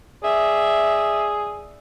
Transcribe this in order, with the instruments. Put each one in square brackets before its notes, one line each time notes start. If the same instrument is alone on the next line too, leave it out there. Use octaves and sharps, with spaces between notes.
[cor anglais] G#4 [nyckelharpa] D5 E5